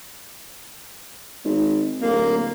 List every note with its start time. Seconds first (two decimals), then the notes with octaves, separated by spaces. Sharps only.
1.45 G#1
2.02 D1 A#3